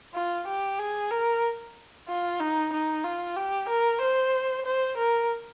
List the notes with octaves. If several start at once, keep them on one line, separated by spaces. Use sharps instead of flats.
F4
G4
G#4
A#4
F4
D#4
D#4
F4
G4
A#4
C5
C5
A#4